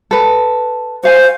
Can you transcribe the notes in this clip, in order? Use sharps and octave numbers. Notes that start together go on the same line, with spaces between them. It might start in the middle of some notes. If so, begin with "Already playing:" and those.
A4 B4
F#4 C5 F5 G#5